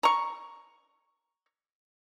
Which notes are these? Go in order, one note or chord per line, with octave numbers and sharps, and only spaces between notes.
A#5 C#6